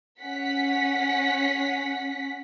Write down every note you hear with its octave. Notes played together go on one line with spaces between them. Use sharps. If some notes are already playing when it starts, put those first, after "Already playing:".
C#4 F#5 B6